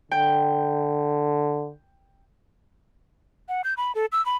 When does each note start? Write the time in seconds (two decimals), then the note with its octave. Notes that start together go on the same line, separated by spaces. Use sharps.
0.11 D3 G5
3.49 F#5
3.64 G6
3.77 B5
3.95 A4
4.12 E6
4.26 B5